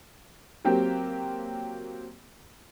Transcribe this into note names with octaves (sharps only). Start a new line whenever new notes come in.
F#3 A#3 C4 G4